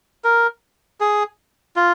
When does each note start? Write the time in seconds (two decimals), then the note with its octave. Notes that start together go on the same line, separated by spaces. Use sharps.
0.24 A#4
1.01 G#4
1.76 F4